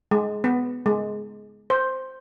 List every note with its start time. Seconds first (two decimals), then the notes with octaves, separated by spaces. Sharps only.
0.11 G#3
0.44 B3
0.86 G#3
1.70 C5